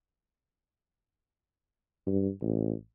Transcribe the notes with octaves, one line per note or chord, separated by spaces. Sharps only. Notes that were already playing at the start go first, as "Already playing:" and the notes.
G2
A1